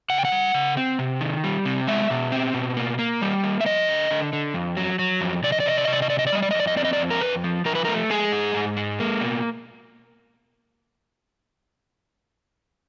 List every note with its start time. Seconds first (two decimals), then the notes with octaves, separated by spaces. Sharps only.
0.10 C#3 F#5
0.18 G5
0.25 F#5
0.32 G3
0.54 C#3
0.77 C4
0.99 C3
1.21 D#3
1.44 G3
1.65 C3
1.88 G#3 E5
2.10 B2
2.32 C4
2.54 B2
2.77 A#3
2.99 A#3
3.22 G3
3.44 A#3
3.61 E5
3.66 F3 D#5
3.88 D3
4.11 D3
4.33 D3
4.54 F2
4.77 F#3
4.99 F#3
5.21 F2
5.43 C3 D5
5.52 D#5
5.60 D5
5.66 C3 D#5
5.77 D5
5.85 C3 D#5
5.93 D5
6.02 D#5
6.10 C3 D5
6.19 D#5
6.27 D5
6.32 G3 D#5
6.43 D5
6.51 D#5
6.54 F2
6.60 D5
6.67 D#5
6.76 C4 D5
6.85 D#5
6.93 D5
7.00 F2
7.10 A#4
7.21 F2 B4
7.44 F3
7.65 F3 A#4
7.75 B4
7.85 A3 A#4
8.10 G#3 G#4
8.32 G#2
8.54 G#2
8.77 G#3
9.00 A#3
9.21 B2